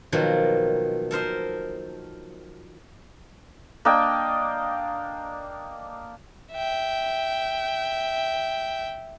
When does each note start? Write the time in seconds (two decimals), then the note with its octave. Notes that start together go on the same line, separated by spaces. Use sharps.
0.12 B2 D#3 F3 F#3 A#3
1.11 A4 A#4 C5 D#5
3.85 A#3 D4 D#5 G5
6.52 E5 G5